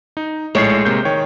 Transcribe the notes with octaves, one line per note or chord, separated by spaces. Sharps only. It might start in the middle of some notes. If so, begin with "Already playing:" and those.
D#4
A#1 A2 G#3 C#5 C7
C3 A#3 G6
D#3 C#5 G5